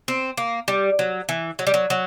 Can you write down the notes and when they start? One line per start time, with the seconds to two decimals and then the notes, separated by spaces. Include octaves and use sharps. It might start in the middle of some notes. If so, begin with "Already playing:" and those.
0.08 C4
0.37 A#3
0.68 G3
0.99 F#3
1.29 E3
1.59 F#3
1.67 G3
1.74 F#3
1.90 F#3